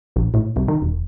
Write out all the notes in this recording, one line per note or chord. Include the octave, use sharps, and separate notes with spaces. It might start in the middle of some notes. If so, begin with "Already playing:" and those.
A#1
A2
C2
D#3
E1